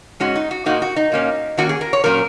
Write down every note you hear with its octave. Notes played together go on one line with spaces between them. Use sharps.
G#2 G#3 C#4 F#4
D#4
F#4
A#2 A#3 D#4 F#4
F#4
D#4
A#2 A#3 C#4
D#3 A#3 C#4 F#4
G#4
A#4
C#5
A#2 F#3 C#4 A#4